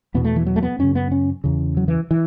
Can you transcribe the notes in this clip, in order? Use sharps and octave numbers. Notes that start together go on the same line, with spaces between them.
E2 B2 B3
A3
E3
F#3
A3
B3
F#2 C#3 C#4
B3
C#4
E2 C#3
F#3
E3
E3